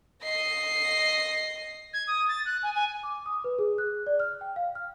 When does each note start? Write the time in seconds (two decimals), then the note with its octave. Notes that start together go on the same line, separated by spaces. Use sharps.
0.23 D#5 C7
1.93 G#6
2.07 D#6
2.29 A6
2.46 F#6
2.63 G#5
2.75 G#5
3.03 D6
3.26 D#6
3.44 B4
3.58 G#4
3.78 F#6
4.06 D5
4.20 F6
4.41 G5
4.56 F5
4.75 F6